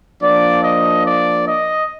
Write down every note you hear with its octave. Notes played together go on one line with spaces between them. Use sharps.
F3 A#3 D4 D5
D#5
D5
D#5